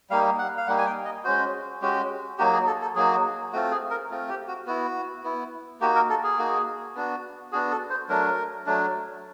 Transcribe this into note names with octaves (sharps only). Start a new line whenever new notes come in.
G3 A#3 D#4 F5
F#5
F5
G3 A#3 D#4 F#5
G#5
G5
D#5
G#3 C#4 F#4 C5
G#3 C#4 F#4 G4
F#3 A#3 D#4 F#4 G4
G#4
A4
A4
F#3 A#3 D#4 F#4 G#4
A3 C4 F4 F#4
G#4
A#4
A3 C4 F4
G4
F#4
B3 E4 F#4
B3 E4
A#3 D#4 F#4 G4
A#4
A4
G#4
A#3 D#4 F#4
B3 D4 F#4
B3 D4 F#4 G#4
A4
C5
F#3 A3 D4 A#4
F#3 A3 D4